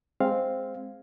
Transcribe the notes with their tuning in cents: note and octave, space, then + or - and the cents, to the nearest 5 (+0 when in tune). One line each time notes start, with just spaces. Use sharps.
G#3 +0 C4 +0 F5 +0